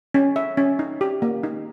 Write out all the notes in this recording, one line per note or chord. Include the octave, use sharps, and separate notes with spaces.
C#4
E5
C#4
D#4
G4
A#3
D#4